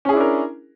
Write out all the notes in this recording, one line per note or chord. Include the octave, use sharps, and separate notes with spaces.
C#4 D4 E4 G#4 A#4